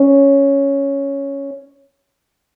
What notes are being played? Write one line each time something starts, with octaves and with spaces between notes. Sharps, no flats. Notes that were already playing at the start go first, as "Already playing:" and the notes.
Already playing: C#4